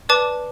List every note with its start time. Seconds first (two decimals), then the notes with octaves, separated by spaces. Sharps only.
0.09 B4 D5 A5 D6